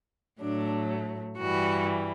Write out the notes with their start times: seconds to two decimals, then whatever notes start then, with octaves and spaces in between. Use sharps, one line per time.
0.40 A2 F#3 A3 D4
1.39 G2 E3 G3 F#4